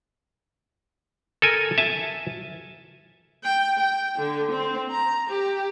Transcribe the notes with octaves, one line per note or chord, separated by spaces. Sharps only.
A4 A#4 G#5
E5 G#5 A5
G5
G5
D3
C4
A#5
G4